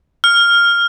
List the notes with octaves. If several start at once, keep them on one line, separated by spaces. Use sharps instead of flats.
F6